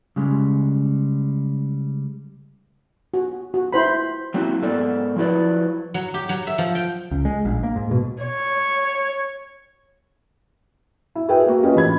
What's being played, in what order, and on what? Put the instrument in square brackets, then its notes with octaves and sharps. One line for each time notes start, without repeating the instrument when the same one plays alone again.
[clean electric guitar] C#3 G3 G#3
[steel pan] F#4
F#4
E4 C5 B5
[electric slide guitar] F#3 A#3 C4 E4 F#4
G#2 B3 A4 A#4 D5
F3 F#3 E4 B4 D5
[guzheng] F#3
G4
F#3
E5
F3
G5
[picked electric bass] C#2
G#3
A#1
A#3
G#2
B2
[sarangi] C#5
[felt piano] E4
F#4 G#4 A#4 B4 E5 G5
A#3 F#4 A#4
C#4 F4 G4 G#4 B4 D#5
A1 B5 G#6